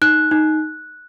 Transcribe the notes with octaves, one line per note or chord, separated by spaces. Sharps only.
D#4 F#6
D#4